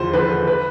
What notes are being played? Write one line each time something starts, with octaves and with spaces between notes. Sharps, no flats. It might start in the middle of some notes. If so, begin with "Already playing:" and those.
Already playing: E2 D3 F3 C5
D3 F3 B4
B4